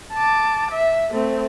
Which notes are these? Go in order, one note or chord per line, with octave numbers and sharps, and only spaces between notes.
A5 D6
E5
A3 C4